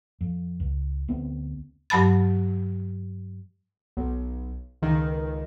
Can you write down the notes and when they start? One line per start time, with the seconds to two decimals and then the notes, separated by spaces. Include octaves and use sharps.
0.21 F2
0.60 C#2
1.08 D2 B3 C4
1.90 G2 F#3 A5 B5 A6
3.97 B1
4.82 C#2 D#3